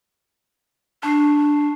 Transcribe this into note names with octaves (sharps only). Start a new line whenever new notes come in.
D4 A5 C#6 C7